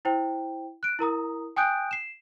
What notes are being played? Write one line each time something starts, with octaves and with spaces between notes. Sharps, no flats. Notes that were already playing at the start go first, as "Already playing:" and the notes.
E4 C5 G5
F#6 D7
E4 A#4 A#5 D#6
G5 G#5 D#6 F#6 G6 D7
C7 E7